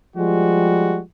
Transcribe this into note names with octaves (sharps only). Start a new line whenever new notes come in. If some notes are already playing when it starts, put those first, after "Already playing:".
F3 G3 G#3 F#4